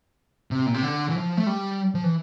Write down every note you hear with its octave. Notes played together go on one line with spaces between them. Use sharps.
C3
A#2
C3
D3
E3
F3
A3
G3
F3
E3